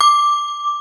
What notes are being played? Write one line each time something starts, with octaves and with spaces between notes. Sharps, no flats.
D6